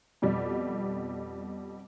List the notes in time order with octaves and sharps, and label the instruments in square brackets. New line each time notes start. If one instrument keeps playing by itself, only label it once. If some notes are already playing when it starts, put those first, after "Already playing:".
[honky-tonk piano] F2 B2 G3